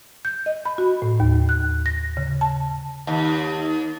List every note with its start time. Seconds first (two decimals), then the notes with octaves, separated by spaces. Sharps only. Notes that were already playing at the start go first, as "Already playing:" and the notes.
0.25 G6
0.46 D#5
0.66 B5
0.78 F#4
1.02 A2
1.20 D#2
1.49 F#6
1.86 A#6
2.17 C#3
2.41 A5
3.07 D#2